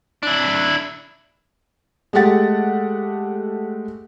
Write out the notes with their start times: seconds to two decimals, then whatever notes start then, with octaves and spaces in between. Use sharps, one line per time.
0.23 D4 E4
2.13 G#3 A3 G4 F#5 A6